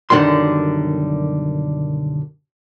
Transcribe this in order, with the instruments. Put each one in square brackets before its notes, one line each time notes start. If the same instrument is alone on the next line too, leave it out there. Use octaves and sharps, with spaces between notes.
[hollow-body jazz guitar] B1 F#2 D3 D#3 G3 C6